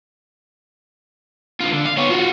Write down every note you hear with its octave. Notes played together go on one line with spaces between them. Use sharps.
D3 F4
D3
F5
B3 C#5
F4 F#4